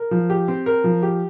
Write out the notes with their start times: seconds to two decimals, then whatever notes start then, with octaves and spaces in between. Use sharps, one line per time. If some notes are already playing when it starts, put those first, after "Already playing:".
Already playing: A#4
0.11 F3
0.30 G4
0.48 C4
0.66 A#4
0.84 F3
1.02 G4